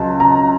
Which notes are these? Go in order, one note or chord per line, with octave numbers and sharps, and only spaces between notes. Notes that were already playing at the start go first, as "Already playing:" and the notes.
Already playing: C#2 C#3 F#3 A5
A#5